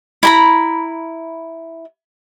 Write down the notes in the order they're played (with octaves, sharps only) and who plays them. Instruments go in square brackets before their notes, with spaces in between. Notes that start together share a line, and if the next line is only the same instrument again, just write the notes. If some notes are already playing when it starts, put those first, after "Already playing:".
[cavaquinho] E4 A#5 B5